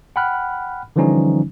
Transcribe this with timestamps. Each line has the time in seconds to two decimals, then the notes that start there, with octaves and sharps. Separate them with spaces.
0.16 F#5 G5 B5 F6 F#6
0.96 D3 E3 F3 G3 C#4 D#4